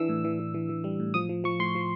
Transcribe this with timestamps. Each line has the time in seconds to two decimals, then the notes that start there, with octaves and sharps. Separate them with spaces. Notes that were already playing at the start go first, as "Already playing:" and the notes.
Already playing: E3 D4 E6
0.09 A2
0.24 E3
0.39 E3
0.54 E3
0.69 E3
0.84 G3
1.00 A2
1.14 F3 D#6
1.29 F3
1.44 F3 C#6
1.60 A2 C6
1.75 F3